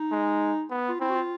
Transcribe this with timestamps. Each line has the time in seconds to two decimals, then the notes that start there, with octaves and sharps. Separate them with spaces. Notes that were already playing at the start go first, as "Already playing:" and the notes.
Already playing: D#4
0.11 G#3
0.70 B3
0.89 F4
1.00 C4 E4
1.10 F#4
1.15 F4